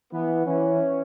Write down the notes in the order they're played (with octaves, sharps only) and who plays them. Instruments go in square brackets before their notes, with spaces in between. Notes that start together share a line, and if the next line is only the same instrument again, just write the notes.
[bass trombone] E3 [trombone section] B3
[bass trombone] E3 [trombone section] C#4